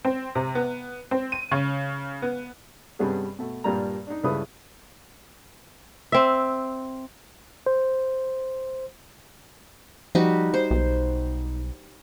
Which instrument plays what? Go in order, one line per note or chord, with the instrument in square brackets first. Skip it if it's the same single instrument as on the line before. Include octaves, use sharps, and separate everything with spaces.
[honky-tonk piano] C4
C3
B3
C4
D#7
C#3
B3
[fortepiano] G2 C3 G3 B3 C#4 G#4
B2 A3
G2 A#2 G3 A#3 A#4 A#5
D4 D#4
C#2 G2 C#3 E4 B4 D#6
[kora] C4 E5
[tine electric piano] C5
[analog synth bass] F3 [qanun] G3 D#4 F#4
[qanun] C5
[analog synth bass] B1